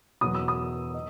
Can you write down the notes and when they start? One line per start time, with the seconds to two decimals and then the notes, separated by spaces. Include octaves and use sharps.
0.21 E2 B2 F#3 B3 F#4 D#6
0.35 E6
0.48 D#6
0.94 D#5